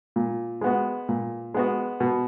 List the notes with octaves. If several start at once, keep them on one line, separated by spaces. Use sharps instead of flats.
A#2
G#3 B3 F#4
A#2
G#3 B3 F#4
B2